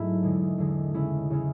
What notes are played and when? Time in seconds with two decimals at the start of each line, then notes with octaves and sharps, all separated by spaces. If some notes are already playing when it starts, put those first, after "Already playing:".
Already playing: G#2 F#3 A3 B3 E4
0.23 E2 D3 G#3
0.58 E2 D3 G#3
0.94 C#3 G#3 C#4 E4
1.30 C#3 G#3 C#4 E4